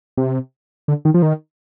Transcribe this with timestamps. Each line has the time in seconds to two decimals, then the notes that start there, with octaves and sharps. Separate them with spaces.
0.17 C3
0.88 D3
1.05 D#3
1.14 F3
1.22 D#3